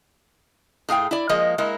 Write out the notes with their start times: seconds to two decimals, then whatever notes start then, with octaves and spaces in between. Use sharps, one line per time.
0.89 A2 G#4 F5 G5
1.11 E4 D5
1.29 F3 G#3 A#3 D#5
1.58 G#3 A#3 E4 A#4